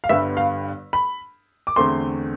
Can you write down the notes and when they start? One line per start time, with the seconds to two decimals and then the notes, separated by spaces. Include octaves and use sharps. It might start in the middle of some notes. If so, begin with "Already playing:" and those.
0.04 F5
0.09 G1 G2 D3 G3 B3 E5
0.37 F5
0.93 B5
1.67 D6
1.76 E2 D3 A3 C4 C6